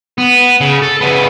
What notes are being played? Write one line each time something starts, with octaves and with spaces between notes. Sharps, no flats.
B3
C#3
A4
C#3 B3